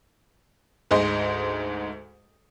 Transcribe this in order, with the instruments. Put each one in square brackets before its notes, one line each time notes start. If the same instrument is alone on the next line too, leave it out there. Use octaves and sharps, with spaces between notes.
[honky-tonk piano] D2 G#2 G#4 D#5 C6